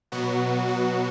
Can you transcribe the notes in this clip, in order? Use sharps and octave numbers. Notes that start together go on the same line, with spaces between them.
B2 F#3 B3 F#4
F#4